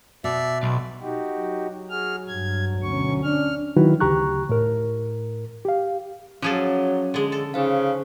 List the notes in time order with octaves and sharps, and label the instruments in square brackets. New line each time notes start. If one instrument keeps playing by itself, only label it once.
[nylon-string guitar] B2 [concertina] D5 E5
[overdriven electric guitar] B1
[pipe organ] D#4 F#4 G4
[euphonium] F#3
[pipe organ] F#4 G#4 F6
[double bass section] G2 [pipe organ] G#6
[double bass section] D2 C#4 [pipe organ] B2 C#6
[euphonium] D4 [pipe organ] F6
[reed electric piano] D#3 F#3 D#4 E4 F#4 B4
D2 C#3 G4 A#5 C#6 F#6
A2 A#4
G4 F5
[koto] F3 G#4 A4 [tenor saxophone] F#3 [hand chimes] C#4
[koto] D3 G#3
A4
[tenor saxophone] C#3 [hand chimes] D#4 C5 F5